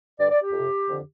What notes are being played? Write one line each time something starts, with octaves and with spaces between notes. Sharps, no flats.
G2 D3 D5
D5
G4
F2 C3
F2 D3